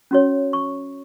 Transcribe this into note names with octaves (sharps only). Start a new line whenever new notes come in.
C#4 F#4 C#5
C#6